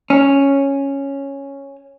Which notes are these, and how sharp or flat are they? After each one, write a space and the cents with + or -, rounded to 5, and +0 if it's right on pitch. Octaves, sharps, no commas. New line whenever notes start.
C#4 -5